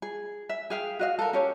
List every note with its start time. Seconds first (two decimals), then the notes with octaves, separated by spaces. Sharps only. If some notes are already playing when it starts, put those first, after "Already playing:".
0.02 G#4
0.49 E5
0.70 G#4 F5 G5
0.99 F#4 D#5 F5
1.19 A4 A#4
1.33 C#4 G4 C#5